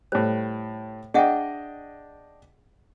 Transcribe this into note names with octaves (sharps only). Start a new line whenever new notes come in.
A2 G3 C5
D4 G#4 D#5 E5 F#5 G5